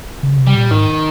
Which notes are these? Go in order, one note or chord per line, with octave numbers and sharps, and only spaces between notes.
C#3
C3
G3
A#2
G#2 D#3